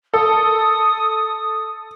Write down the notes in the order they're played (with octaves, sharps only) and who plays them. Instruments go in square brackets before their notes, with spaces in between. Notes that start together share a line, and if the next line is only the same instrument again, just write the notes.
[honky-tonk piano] A4 [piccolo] D#6